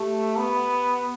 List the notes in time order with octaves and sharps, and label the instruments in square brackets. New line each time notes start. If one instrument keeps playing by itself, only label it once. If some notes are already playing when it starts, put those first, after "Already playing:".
Already playing: [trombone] A3 [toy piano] G4
[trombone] B3